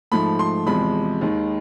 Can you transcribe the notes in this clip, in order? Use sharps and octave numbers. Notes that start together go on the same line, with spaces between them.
G#2 F3 A3 B5
C6
E2 C3 F3 G#3 B5
D#2 D#3 G#3